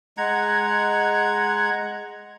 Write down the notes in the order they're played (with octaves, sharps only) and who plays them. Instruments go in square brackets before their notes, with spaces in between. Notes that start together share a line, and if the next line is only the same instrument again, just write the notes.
[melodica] G#3 A#5 [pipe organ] F#5 G#6